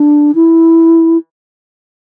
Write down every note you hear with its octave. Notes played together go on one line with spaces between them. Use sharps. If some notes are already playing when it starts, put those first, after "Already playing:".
Already playing: D4
E4